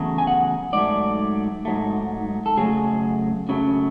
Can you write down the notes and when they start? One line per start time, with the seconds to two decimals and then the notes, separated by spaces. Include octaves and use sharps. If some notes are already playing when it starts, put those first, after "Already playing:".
Already playing: E2 C#3 F#3 A3
0.18 G#5
0.27 F#5
0.73 G#2 F#3 A3 D5
1.65 G#2 F#3 A3
2.46 A4
2.57 F#2 C#3 F#3 A3 G#4
3.49 F#2 C#3 F#3 A3